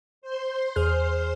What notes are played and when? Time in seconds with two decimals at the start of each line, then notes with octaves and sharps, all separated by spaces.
0.22 C5 C6
0.76 E2 G#4 F6